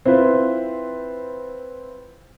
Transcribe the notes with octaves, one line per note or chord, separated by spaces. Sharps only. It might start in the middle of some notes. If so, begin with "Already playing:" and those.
C4 E4 F4 B4 C5